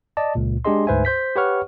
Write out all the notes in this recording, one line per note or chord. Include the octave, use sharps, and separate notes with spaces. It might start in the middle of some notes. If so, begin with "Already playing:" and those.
D5 D#5 A5
C#2 A#2
G#3 D4 G4 G#4 D#5 C6
D2 G#2 B4 C5 E5 G#5
C5 G6 B6
G4 B4 C#5 F#5 C#6 F6